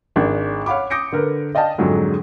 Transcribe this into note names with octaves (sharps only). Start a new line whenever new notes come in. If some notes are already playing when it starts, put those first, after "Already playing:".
G#1 G#3 D4
C#5 F5 F#5 B5 D6
D6 D#6 G6 A#6 C#7 D7
D3 A#4 B4
D5 D#5 F5 G5 A5
F2 G#2 D3 F#3 G#3